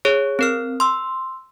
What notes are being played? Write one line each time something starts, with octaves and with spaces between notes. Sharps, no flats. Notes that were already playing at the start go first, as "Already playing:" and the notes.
G#4 C#5
C4 A#4 F6
C6 E6